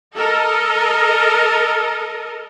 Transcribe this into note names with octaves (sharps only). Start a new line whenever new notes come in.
A4 A#4 D#5